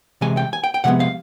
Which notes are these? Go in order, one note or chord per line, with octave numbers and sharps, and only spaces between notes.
C3 E3 G#3 G#5
G5
G#5
G5
G5
C3 F3 G#3 B3 F#5
F5